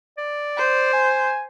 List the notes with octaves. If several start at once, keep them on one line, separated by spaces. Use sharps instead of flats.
D5
C5
G#5